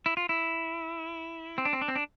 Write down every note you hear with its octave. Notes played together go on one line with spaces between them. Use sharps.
E4
F4
E4
C4
D4
C4
D4
C4
D4